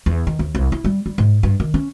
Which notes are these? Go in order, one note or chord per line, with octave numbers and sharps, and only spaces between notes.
E2
D#3
D#2
C2
E4
G3
G3
G#2
G2
D#3
C#4